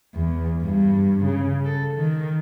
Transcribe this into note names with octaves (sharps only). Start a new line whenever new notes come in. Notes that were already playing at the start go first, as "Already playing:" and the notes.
E2
G2
C#3
A4
D#3